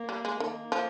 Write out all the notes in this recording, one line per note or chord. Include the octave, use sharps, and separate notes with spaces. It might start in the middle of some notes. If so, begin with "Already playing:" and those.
Already playing: A#3
G3
G#3
D#3 A#3
F3